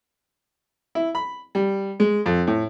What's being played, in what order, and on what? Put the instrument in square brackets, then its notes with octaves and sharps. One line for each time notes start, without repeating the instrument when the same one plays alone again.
[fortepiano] E4
B5
G3
G#3
F2
A2